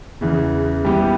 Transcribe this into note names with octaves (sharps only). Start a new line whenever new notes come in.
E2 C#3 E3
E3 G3 B3 G4